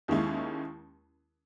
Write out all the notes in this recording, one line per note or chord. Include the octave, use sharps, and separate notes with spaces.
D#2 D#3 G#3 C#4 E4